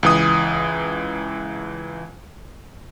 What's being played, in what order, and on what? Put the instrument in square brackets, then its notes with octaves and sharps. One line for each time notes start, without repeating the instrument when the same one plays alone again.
[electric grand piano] C#2 E3 D#6